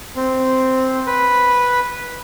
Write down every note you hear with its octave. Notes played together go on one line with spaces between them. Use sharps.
C4
B4